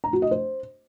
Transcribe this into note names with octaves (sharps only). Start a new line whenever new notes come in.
A#5
F#4
D#5
C5